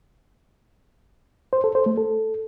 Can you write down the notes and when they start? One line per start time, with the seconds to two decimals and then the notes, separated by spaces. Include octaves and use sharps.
1.53 C5
1.64 A4
1.75 C5
1.86 A3
1.97 A4